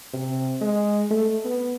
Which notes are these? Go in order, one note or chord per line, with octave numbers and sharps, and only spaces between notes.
C3
G#3
A3
B3